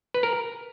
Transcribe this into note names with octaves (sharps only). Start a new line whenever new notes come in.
B4
A#4